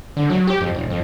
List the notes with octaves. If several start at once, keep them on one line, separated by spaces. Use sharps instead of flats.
D3
F#3
G4
F2
E1
F2